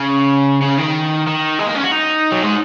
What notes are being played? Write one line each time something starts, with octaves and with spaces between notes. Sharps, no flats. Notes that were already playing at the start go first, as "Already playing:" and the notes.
Already playing: C#3
C#3
D#3
D#3
G#3
A#3
C#4
F#4
D#4
F#3
G#3